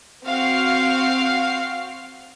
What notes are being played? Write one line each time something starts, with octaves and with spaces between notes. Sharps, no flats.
C4 F#4 F5 F6 C7